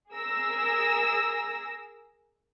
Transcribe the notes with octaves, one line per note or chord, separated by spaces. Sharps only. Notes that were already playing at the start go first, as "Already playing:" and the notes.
G#4 A#4 E6 A#6